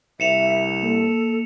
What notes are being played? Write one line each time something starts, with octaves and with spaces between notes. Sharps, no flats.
C2 E5 C#7 E7 F7
A#3 A4